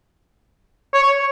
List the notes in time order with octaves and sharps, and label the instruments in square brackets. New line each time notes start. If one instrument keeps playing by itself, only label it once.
[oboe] C#5